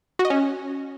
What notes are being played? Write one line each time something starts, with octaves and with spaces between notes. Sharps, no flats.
F#4
D#5
C#4